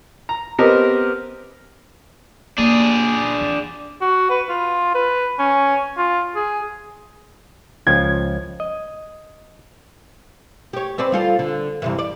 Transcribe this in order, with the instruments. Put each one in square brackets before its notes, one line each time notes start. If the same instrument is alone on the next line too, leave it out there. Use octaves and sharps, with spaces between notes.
[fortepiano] A#5
B3 C4 G4 A#4 D#5
[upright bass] A#3 [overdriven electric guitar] D4 G#4
[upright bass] E3 C4
[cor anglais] F#4
B4
F4
B4
C#4
F4
G#4
[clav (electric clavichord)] C#2 F3 G5 [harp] G#6
[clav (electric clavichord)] D#5
[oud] G4 C#5
C4 B4 D5
G3 F4 A4
D3
G2 C3 E3
D5